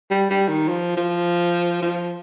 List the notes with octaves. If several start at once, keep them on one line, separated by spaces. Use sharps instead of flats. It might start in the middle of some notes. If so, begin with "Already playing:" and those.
G3
G3
D#3
F3
F3
F3